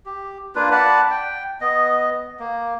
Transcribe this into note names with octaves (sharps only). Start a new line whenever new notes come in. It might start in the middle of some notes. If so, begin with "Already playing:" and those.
G4
A#3 D4 F4 B4
D5 F#5 A5 B5
G5
B3 D#5
A#3